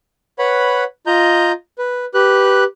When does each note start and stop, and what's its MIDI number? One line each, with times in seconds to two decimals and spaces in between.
0.39 0.84 71
0.39 0.84 73
0.39 0.84 78
0.39 0.84 83
1.07 1.52 65
1.07 1.52 75
1.07 1.52 82
1.07 1.52 91
1.78 2.05 71
2.14 2.64 67
2.14 2.64 71
2.14 2.64 90